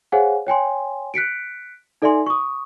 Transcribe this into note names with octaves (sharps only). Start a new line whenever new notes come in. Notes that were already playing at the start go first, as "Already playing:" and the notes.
G#4 C5 C#5 F5 F#5 G#5
C#5 G5 G#5 C6
F#6 B6 C#7 D7
D#4 A4 D5 E5 G#5 C6
C#6 D#6